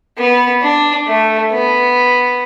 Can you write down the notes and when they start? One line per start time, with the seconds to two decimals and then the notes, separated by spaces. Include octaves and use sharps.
0.18 B3
0.62 D4
1.07 A3
1.52 B3